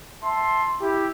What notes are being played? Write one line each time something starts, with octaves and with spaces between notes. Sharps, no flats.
E5 A5 C6
E4 G4